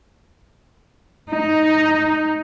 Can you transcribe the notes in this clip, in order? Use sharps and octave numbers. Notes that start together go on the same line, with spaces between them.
D#4